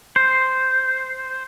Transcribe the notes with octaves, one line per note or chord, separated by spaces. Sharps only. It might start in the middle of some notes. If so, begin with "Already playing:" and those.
C5